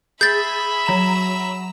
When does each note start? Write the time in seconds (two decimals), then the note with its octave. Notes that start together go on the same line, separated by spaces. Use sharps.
0.21 G#4 E5 B5 G6 A6
0.86 F#3 A#5 E7